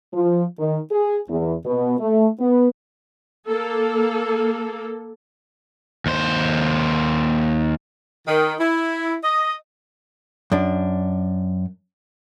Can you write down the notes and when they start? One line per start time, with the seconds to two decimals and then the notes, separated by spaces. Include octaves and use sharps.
0.12 F3
0.57 D#3
0.90 G#4
1.27 E2
1.64 B2
1.98 A3
2.39 B3
3.48 A#3 A4
6.06 D#2 C5
8.27 D#3
8.59 E4
9.24 D#5
10.52 F#2 D4